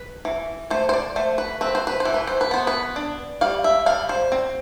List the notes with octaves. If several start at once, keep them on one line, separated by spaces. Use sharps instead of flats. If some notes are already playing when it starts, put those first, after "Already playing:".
Already playing: B4
E3
A3 C5
C5
D5
A3 C5
B4
C4 B4
C5
B4
C5
E3
B4
C5
B4
B3 C5
B4
D4
G3 F5
E5
G3 F5
C5
C4